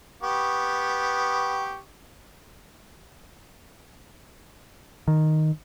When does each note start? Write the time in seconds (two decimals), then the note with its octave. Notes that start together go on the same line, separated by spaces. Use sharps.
0.23 B3 G4 C#6
5.08 D#3